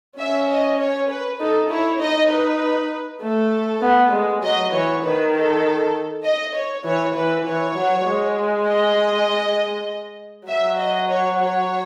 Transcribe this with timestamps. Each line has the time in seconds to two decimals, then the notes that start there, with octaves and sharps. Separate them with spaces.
0.19 C#4 E5
0.49 D#5
0.79 C#5
1.09 B4
1.40 D#4 A4
1.70 E4 C#5
2.00 D#4 D#5
2.30 B4
3.22 A3 A4
3.82 B3
4.12 G#3
4.42 F#3 D#5
4.73 E3 C#5
5.03 D#3 B4
5.33 A4
6.24 D#5
6.55 C#5
6.84 E3 C#5
7.15 E3 B4
7.45 E3 C#5
7.76 F#3
8.06 G#3
8.66 D#5
10.48 F#3 E5
10.77 D#5
11.09 C#5
11.39 C#5